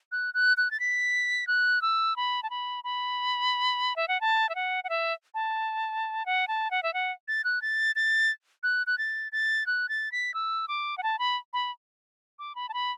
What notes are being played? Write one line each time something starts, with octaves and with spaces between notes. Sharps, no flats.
F#6
F#6
F#6
A6
B6
F#6
E6
B5
A5
B5
B5
E5
F#5
A5
E5
F#5
F#5
E5
A5
F#5
A5
F#5
E5
F#5
A6
F#6
A6
A6
F#6
F#6
A6
A6
F#6
A6
B6
E6
D6
F#5
A5
B5
B5
D6
B5
A5
B5